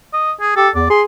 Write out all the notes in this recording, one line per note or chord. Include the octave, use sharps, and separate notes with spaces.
D#5
G#4
G4 A4
E2 D5
G#4 C6